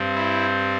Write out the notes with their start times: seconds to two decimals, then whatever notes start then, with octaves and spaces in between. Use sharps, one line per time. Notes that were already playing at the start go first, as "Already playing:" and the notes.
Already playing: G2 G3 C4
0.16 E4